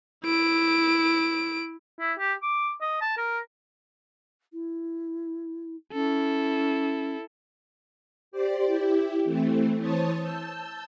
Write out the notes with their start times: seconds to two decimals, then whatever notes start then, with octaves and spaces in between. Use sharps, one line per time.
0.24 E4 D7
1.99 E4
2.19 G4
2.42 D6
2.81 D#5
3.02 A5
3.17 A#4
4.53 E4
5.93 C#4 E4 A4
8.32 G4 C5 D5
8.66 E4 G4
9.25 E3 A3 C4
9.78 E3 C5 C#5 A5 D#6 A6
10.18 A5 E6 G6